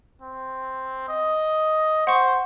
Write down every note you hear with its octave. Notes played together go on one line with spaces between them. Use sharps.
C4
D#5
C5 F#5 C#6